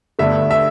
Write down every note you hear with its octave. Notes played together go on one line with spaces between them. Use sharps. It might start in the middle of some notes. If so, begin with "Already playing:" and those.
G1 G2 D3 A3 D4 E5
E5